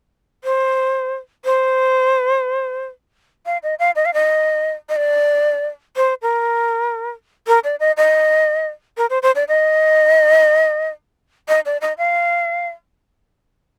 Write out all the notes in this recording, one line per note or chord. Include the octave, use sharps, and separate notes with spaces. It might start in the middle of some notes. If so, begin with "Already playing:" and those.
C5
C5
F5
D#5
F5
D#5
F5
D#5
D#5
D5
C5
A#4
A#4
D5
D#5
D#5
A#4
C5
C5
D5
D#5
D#5
D5
D#5
F5